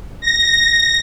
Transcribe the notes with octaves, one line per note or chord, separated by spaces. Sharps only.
A#6